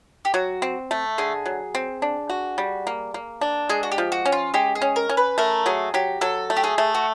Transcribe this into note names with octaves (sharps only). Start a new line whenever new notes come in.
G4
F#3 F#4
C4
A3
D3 G#4
F#3
C4
D4
F#4
G3
A#3
A#3
D4
G#3 G#4
F#4
G4
F3
F#4
C#4
F4
G#3 G4
G#4
C#4
A#4
C#4
B4
A3 A#4
F#3 G#4
F#3 G4
F#3 A4
A3
G4
G#4
A3
F#4